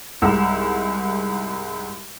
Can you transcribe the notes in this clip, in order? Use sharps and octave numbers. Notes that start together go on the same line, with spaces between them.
C2 G#2 E6